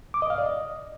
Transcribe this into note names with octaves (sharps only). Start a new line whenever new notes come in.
D6
D#5
F5
D5
D#5